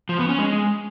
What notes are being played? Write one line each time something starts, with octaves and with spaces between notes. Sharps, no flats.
F3
B3
C#4
G#3